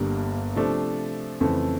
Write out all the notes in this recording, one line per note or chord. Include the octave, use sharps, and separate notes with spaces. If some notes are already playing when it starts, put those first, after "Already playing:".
Already playing: G1 G2 D3 G3 A#3
C3 F3 A3 D4
F2 C#3 E3 A3